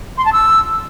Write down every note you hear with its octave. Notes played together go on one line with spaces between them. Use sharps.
C6
A5
E6